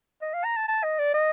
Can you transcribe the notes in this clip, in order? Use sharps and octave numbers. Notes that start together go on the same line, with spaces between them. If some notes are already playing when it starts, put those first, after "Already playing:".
D#5
F5
A#5
A5
A5
D#5
D5
D#5